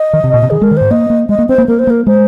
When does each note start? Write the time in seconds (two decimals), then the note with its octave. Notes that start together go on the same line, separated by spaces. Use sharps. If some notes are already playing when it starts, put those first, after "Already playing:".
Already playing: D#5
0.13 D#3
0.24 C3
0.33 A#2
0.42 C3
0.50 D#3 G#4
0.62 G#3 A#4
0.71 D#3
0.77 G#2 C5
0.91 A#3 D#5
1.10 A#3
1.29 G#3 D#5
1.39 A#3
1.49 C4 C5
1.58 A#3
1.68 A#3 A#4
1.79 C5
1.87 A#3 A#4
2.07 G#3 C5